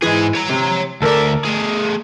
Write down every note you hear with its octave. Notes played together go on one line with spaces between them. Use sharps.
G#2 E3 G#3 G#4
C#5 A#5
C3
D2 A4 A#4 D5 E5
A3 G#4